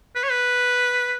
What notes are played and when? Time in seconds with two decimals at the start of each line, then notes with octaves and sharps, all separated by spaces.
0.15 B4
0.23 C#5
0.31 B4